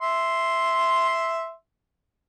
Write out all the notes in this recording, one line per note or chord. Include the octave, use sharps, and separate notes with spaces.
E5 C6